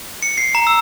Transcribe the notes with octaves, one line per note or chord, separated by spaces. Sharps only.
C#7
C7
A#5
E6